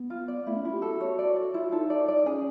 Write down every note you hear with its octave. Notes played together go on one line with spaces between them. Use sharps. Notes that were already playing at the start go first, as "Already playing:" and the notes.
Already playing: B3
F4
D5
A3 E4
C#4
E4 F4
G4
F#4 A4
C#5
D5
A4
E4 F4
D#4 A4
D5
D5
C#4 G#4